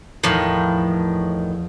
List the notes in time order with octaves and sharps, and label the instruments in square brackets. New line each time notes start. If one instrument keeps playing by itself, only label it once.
[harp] E2 F3 [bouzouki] A2 D#3